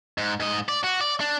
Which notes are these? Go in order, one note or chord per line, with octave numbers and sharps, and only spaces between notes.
G#2
G#2 D#5
D5
F#4
D5
D4